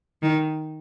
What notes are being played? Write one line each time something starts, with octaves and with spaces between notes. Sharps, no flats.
D#3